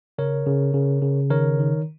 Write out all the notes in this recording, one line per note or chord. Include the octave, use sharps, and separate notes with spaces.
C#3 A#4 C#5
C#3
C#3
C#3
D#3 A#4 C#5
D#3